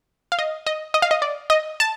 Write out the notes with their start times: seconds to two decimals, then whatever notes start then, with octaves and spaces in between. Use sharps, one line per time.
0.32 F5
0.39 D#5
0.66 D#5
0.94 D#5
1.02 F5
1.11 D#5
1.22 D5
1.50 D#5
1.80 A5